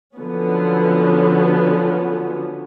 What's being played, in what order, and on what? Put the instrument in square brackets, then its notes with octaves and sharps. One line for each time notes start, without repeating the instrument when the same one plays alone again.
[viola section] D3 F3 F#3 B3 C#4